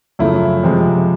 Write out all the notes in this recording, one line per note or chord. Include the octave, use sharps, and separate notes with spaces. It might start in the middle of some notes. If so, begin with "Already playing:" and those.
F#2 C#3 F3 A3 E4
F2 C3 F3 G#3